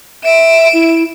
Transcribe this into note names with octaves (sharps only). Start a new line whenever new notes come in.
E5 D7 E7
E4